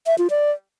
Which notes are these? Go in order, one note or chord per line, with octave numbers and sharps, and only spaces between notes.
E5
F4
D5